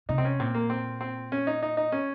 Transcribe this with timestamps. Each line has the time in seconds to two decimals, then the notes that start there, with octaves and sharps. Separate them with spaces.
0.09 C3 D#4
0.18 C4
0.25 C#4
0.40 A#2 C4
0.54 A#3
0.70 C4
1.01 C4
1.32 C#4
1.47 D#4
1.62 D#4
1.77 D#4
1.92 C#4